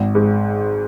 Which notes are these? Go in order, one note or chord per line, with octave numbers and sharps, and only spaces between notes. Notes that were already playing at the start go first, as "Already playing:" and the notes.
Already playing: G#1
G#2